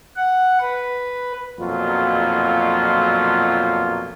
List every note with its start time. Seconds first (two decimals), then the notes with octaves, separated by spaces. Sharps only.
0.16 F#5
0.60 B4
1.59 B1 F2 A#2 F#3 F4